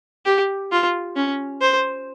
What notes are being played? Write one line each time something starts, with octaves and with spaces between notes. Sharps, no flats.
G4
F4
C#4
C5